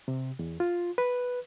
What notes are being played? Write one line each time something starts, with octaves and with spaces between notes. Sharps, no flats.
C3
E2
F4
B4